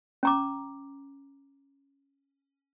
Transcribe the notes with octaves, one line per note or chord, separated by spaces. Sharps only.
C#4 A#5 D6